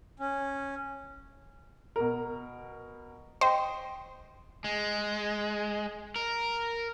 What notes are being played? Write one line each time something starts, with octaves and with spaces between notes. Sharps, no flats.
C#4
B2 A#4
C5 D#5 G5
G#3
A#4